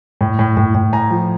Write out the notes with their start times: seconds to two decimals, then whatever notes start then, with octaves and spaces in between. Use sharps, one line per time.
0.21 A2
0.39 A2
0.57 A2
0.75 A2
0.93 A2 G#5 A#5
1.11 F3